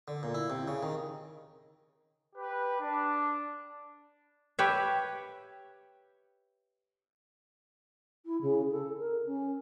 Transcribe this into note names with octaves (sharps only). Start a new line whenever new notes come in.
D3
A#2
E4
C3
C#3
D#3
G4 B4
D4
G4 B4 C#5 E5
E4
C#3
A4
A#4
C#4